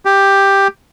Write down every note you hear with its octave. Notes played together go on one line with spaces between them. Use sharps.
G4